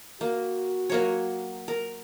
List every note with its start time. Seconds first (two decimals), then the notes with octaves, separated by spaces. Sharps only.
0.21 A#3 F#4
0.90 F#3 A#3 C#5
1.68 A#4